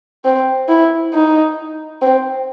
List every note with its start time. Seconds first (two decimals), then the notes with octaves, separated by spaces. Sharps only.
0.25 C4
0.68 E4
1.14 D#4
2.02 C4